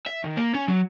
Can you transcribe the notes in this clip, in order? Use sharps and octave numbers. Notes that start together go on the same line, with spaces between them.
E5
D#3
A#3
C#4
F#3